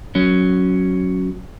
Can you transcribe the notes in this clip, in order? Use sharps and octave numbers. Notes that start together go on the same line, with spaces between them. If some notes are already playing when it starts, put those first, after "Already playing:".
F#3 C#4